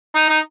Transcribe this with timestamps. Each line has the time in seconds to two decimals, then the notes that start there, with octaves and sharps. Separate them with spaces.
0.15 D#4
0.29 D#4